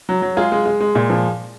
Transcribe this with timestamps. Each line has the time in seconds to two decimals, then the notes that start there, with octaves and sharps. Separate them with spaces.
0.09 F#3
0.22 F#3
0.37 G#3 F4 G#4
0.52 G#3
0.66 G#3
0.81 G#3
0.95 A#2
1.10 F3